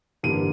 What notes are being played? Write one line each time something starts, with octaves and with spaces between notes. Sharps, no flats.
A1 G2 D3 G3 A#3 D#7